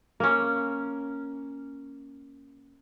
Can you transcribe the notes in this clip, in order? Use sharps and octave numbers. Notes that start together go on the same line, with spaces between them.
A#3 C#4